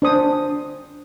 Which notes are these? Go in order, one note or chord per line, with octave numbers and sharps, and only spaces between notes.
D4 C5 D#6